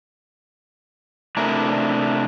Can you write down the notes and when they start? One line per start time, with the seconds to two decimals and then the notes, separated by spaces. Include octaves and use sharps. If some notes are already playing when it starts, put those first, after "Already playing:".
1.37 C3 A3 D4 E4 A#4 D5